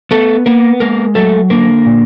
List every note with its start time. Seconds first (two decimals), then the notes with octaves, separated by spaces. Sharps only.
0.11 A3 B3 A4
0.46 A#3 B3 A#4
0.80 G#3 A#3 A#4
1.15 F#3 A3 A4
1.50 D3 A#3 A#4
1.86 A#2